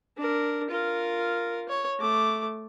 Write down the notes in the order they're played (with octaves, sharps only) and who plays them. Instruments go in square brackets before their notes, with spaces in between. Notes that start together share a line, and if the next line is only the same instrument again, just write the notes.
[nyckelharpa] D4 A#4
F4 A#4
C#5
A3 D6